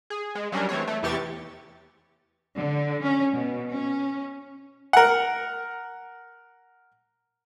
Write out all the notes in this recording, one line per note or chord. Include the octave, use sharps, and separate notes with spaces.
G#4
G#3
F#3 G3 C#4 D4 A#4
E3 A3 C4 C#5
A3
E2 C3 E3 G4 C#6 A6
D3
C#4
B2
C#4
A#4 F#5